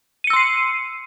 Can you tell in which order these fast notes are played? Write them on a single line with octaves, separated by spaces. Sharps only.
D#7 C#7 E6 C6 C7